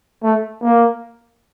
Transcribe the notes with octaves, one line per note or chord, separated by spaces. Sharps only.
A3
A#3